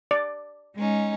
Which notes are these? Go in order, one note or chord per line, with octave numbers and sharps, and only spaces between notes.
D5
G#3 C#4 D#4